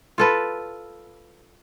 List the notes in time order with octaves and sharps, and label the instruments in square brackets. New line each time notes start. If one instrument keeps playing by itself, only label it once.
[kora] F4 A4 B4